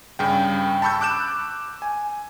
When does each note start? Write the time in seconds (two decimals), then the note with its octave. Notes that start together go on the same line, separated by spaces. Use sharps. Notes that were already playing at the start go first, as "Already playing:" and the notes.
0.19 G2 C#3 G5
0.82 A5 B5 C#6 E6 G6
1.01 D6 F#6 G6 E7
1.82 G#5